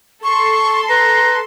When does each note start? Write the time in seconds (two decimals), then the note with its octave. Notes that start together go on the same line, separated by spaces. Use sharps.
0.24 A4 C6 C#6
0.89 B4 A#5